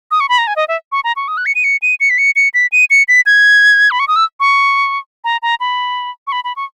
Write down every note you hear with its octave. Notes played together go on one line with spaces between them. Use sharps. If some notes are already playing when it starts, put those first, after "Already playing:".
D#6
C#6
B5
A#5
G#5
D#5
E5
C#6
A#5
C#6
D#6
F#6
C#7
D#7
C#7
D#7
C#7
B6
C#7
C#7
B6
D#7
C#7
B6
G#6
B5
C#6
D#6
E6
C#6
A#5
A#5
B5
C#6
B5
B5
C#6